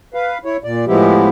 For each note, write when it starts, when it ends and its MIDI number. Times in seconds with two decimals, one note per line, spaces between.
0.14 0.38 71
0.14 0.38 77
0.45 0.57 64
0.45 0.57 73
0.64 0.85 46
0.64 0.85 74
0.87 1.29 45
0.87 1.29 53
0.87 1.29 56
0.87 1.29 59
0.87 1.29 64
0.87 1.29 67